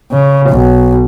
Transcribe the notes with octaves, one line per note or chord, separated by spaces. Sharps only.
C#3
B1